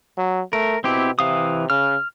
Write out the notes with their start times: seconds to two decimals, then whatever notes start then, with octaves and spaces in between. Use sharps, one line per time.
0.17 F#3
0.53 A3 A#4
0.84 B2 C4 E4 G4
1.19 C3 E3 F5 D#6
1.70 C#3 F6